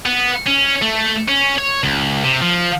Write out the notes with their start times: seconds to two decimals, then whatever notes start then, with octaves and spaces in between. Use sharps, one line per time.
0.06 B3
0.46 C#4
0.82 A3
1.28 C#4
1.58 C#5
1.83 C#2
2.24 C3
2.42 F3